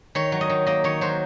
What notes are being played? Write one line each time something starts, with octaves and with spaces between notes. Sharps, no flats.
D#3 C#5
F#3
D#5
D#3
A#3 D#5
D#3 C#5
F#3 C5